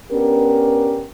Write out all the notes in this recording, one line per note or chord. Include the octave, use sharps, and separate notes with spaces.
B3 C#4 D4 G4 A#4